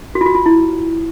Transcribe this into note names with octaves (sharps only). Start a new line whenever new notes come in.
F#4
F4
F#4
F4
E4